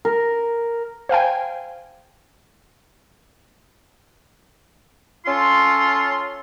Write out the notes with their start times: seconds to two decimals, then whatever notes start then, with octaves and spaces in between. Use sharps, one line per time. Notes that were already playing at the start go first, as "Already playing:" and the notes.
0.05 A#4
1.09 C5 F5 G5 G#5
5.26 C#4 F4 A4 C6